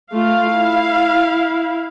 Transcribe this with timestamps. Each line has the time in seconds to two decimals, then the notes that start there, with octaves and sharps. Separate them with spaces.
0.13 A3 F4 F5
0.52 E4